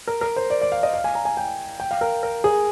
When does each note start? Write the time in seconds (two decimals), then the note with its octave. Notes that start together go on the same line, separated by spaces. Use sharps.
0.07 A#4
0.21 A#4
0.36 C5
0.50 D5
0.61 D5
0.72 F5
0.83 D#5
0.93 F5
1.04 G#5
1.15 A#5
1.25 G#5
1.37 G5
1.80 G5
1.91 F5
2.01 A#4
2.23 A#4
2.44 G#4